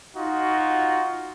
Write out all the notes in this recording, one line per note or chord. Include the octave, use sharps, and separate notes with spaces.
D#4 F4 F#4